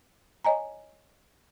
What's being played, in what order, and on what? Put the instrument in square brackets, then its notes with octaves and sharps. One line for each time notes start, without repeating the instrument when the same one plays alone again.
[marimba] C#5 D#5 G#5 A#5